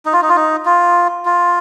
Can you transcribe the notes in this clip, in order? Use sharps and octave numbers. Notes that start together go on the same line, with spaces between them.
D#4
F4
D#4
F4
D#4
F4
F4